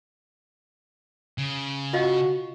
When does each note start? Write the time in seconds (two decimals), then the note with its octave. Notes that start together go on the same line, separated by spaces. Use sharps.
1.38 C#3
1.93 F4 F#4 D#5 F5